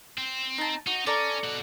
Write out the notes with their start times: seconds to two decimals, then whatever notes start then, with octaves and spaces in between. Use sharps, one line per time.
0.18 C4
0.58 D#4 A5
0.87 D#4 F#4
1.07 C#4 A4 D5 A#5
1.44 B2 F#5